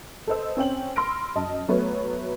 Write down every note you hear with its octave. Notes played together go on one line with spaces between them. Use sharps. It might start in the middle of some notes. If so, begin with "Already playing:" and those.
A4 B4 C5 D#5 E6
C4 C#4 G5 F#7
B5 C6 E6 F6 A#6 D7
F#2 D#5 A5
F#3 A3 B3 F#4 C#5